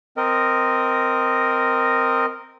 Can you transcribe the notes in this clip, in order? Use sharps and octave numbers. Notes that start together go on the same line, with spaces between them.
C4 A#4 D#5